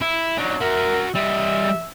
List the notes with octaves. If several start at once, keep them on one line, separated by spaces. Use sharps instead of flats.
E4
F#3 D4 D#4
F#4 A#4 E5
G3 D#5 E5